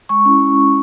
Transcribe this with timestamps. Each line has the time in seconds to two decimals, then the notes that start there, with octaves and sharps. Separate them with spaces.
0.09 G#3 C#6
0.26 C#4 E4